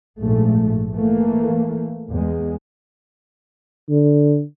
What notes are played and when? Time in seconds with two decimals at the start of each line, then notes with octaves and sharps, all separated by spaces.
0.19 A#1 G#2 A3
0.93 E3 A3 A#3
2.11 E2 G#3
3.90 D3